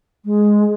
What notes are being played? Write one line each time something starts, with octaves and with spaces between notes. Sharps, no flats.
G#3